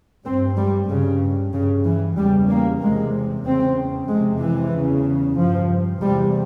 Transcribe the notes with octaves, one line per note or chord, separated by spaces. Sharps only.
G2 C4
G3
G2 C#3
G2 C#3
E3
E2 C#3 G3
A#3
E2 C3 G#3
E2 C#3 C4
F2 C3 G#3
E3
E2 C#3
G2 F3
E2 C3 G3